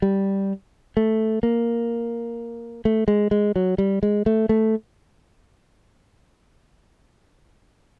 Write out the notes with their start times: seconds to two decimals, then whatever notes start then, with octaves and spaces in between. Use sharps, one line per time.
0.02 G3
0.97 A3
1.43 A#3
2.85 A3
3.08 G#3
3.31 G#3
3.56 F#3
3.78 G3
4.03 G#3
4.26 A3
4.49 A3